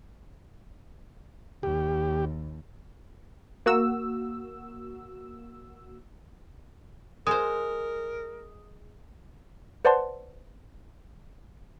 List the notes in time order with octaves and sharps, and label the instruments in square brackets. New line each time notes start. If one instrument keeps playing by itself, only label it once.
[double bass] D#2 [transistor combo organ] G4
[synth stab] A#3 F#4 E6
[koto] G#3 C5 [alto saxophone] A#4 [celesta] D#6
[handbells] B4 C5 D5 F#5 A5 C6